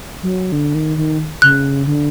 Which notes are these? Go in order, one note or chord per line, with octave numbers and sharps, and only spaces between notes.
F#3
D3
D#3
D#3
C#3 F#6
D3